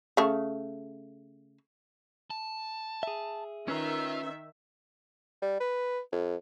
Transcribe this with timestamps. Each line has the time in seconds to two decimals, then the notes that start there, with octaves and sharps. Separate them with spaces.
0.17 C#3 A3
2.30 A5
3.03 G#4 E5
3.68 D#3 C#4 F4 B4 E5 A#5
5.42 G3
5.60 B4
6.12 F2